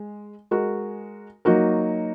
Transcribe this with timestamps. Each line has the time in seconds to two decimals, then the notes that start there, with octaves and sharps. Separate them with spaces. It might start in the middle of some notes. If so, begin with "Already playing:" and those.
Already playing: G#3
0.51 G#3 F#4 A#4
1.45 F#3 A#3 D#4 F#4 A#4